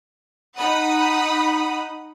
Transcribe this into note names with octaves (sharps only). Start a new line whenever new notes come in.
D#4 F#5 B5 D#6